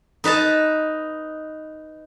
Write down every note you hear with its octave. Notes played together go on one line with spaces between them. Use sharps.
D#4 B4 D#5 A5